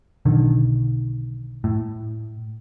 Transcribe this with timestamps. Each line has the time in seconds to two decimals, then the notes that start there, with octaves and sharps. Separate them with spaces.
0.25 B1 D3 D#3
1.64 A2